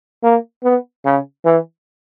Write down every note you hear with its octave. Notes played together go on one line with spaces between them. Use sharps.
A#3
B3
C#3
E3